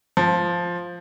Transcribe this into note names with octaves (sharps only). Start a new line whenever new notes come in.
F3